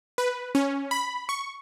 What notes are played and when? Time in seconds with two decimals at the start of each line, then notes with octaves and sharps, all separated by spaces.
0.18 B4
0.55 C#4
0.91 B5
1.29 C#6